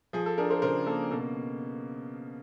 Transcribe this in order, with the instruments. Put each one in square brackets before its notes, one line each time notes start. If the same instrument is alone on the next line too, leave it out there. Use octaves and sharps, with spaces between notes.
[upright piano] F3 G#4
A4
D4 G#4 A#4
A#4 C5
C#3 A#4 C5
A#3 A4
B2 A4